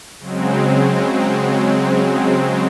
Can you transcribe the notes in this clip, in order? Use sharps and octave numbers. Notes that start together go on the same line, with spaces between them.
C#3 F#3 G#3 C4